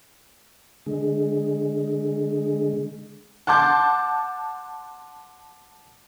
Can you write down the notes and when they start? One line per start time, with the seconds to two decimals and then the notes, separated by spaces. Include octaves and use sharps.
0.86 D3 G#3
3.47 F#5 A5 C6 D6 G6